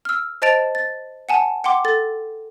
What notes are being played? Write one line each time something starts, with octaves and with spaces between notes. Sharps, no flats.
E6 F6
C5 D#5 A5 A6 D7 F7
A6
F#5 G#5 A5
F#5 G5 C6 D6
A4 A6